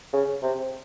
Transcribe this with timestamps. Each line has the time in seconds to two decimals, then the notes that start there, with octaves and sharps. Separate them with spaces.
0.13 C#3
0.42 C3